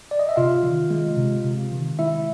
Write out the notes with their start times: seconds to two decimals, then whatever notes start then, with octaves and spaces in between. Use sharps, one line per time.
0.11 D5
0.19 D#5
0.29 E5
0.36 C3 F4 F5
0.63 D#3
0.90 G#3
1.17 C3
1.44 C3
1.72 D#3
1.99 G#3 E4 E5